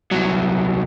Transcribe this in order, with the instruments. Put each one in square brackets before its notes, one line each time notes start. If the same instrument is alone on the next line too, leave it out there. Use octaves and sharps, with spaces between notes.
[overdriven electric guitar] C2 F#3